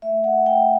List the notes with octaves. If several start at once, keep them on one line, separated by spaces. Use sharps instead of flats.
A3 E5
F#5
A3 G5